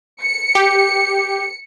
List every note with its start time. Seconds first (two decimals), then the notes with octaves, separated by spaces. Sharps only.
0.23 C#7
0.55 G4